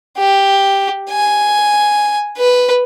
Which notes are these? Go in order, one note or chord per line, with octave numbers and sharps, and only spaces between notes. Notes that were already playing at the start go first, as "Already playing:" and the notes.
G4
G#5
B4